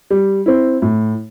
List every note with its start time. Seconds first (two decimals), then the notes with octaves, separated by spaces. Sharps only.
0.11 G3
0.46 C4 E4
0.82 A2